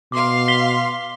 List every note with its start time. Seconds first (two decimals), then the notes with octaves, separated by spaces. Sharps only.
0.12 B2 F5 C6 D6
0.48 B6 G7